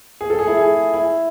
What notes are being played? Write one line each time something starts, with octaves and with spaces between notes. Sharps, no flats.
G#4
A4
G#4
E4
G#4
E4